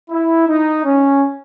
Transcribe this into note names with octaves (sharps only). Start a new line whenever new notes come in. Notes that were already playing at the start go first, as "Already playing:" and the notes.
E4
D#4
C#4